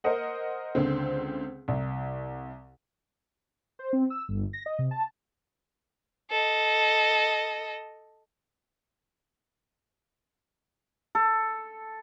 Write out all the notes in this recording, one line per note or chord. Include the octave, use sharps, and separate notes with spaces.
A#4 C5 D#5 F#5
C#2 D3 C4
C2
C5
C4
E6
G1
A#6
D#5
C3
A5
A4 D#5
A4